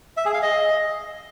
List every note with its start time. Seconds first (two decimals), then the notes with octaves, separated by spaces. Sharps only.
0.17 E5
0.25 G#4
0.34 F5
0.42 D#5